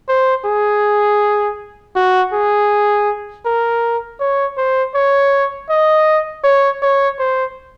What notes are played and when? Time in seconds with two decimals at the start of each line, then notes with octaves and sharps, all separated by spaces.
0.08 C5
0.45 G#4
1.96 F#4
2.33 G#4
3.46 A#4
4.20 C#5
4.57 C5
4.95 C#5
5.70 D#5
6.44 C#5
6.82 C#5
7.19 C5